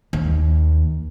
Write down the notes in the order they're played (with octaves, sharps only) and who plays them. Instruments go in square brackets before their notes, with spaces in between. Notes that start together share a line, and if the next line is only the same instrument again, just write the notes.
[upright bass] D#2